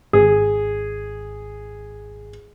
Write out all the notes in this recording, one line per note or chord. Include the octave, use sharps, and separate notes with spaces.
G#1 G#4